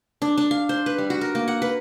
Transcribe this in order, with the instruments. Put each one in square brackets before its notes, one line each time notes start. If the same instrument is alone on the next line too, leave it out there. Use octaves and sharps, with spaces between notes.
[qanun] D4
D4
F5
C5
B4
G3
F#4
A#4
A#3
F#5
B4